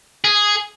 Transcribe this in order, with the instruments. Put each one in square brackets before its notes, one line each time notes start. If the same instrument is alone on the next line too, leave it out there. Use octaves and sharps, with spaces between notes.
[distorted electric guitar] G#4